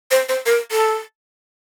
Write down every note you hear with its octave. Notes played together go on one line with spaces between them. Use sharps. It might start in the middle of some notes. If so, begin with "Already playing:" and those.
C5
C5
A#4
A4